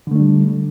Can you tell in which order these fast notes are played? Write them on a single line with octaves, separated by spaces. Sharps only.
D3 A3 D4 G3